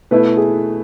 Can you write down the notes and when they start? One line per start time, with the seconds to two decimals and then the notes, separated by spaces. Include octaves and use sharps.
0.11 B2 A3 E4 B4
0.37 G#4